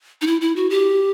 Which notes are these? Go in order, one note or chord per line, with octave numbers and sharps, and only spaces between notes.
D#4
E4
E4
F#4
G4